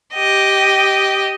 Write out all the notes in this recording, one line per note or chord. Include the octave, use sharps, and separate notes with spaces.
G4 D#5